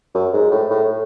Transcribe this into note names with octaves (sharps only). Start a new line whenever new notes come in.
F#2
G#2
A2
A2